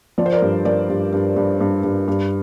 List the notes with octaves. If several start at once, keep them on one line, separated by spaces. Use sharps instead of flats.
F3 D5
C5
A#4 D5
G2
F3 A#4 D5
G2
G2
G2
G2
G2
G2